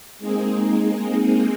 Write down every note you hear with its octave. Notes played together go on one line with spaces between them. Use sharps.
G#3 A#3 C4 D#4 G#4